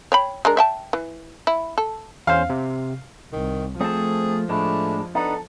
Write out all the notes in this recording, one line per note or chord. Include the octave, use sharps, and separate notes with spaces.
C#5 G5 B5
G#3 D4 A#4
E5 G5 A5
E3
E4
A4
E2 C#4 C5 F5
C3
C2 D#3
F3 A3 C4 G#4 A5
A2 G#3 A3 D4
B3 D4 D#4 A4